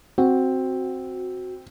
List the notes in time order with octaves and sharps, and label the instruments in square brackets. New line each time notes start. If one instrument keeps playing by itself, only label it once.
[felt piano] C4 [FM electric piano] F#4